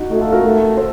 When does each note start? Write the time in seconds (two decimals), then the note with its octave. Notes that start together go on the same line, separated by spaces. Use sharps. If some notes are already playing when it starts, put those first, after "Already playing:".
Already playing: D#4 F#4
0.11 A3 D#4 F#4
0.21 F4 A4
0.32 F#4 A#4
0.44 A3
0.77 A4 C5